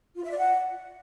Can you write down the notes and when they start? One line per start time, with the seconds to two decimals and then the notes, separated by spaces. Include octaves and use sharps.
0.17 F4
0.24 E5
0.30 D5
0.37 F#5